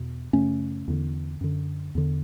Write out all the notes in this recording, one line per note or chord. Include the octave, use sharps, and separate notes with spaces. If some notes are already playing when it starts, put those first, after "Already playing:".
Already playing: E2 B2
F#2 C#3 A3 C#4
E2 D3
F#2 D3
E2 D3